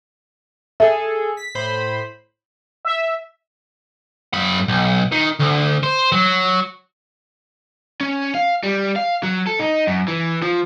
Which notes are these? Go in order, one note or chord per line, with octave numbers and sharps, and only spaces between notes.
G#4 A4 E5
B6
A2 C5 B5
E5
F#2 B5
B1
D#3
D2
C5
F#3
C#4
F5
G3
F5
F#3
A4
D#4
F#2
E3
F3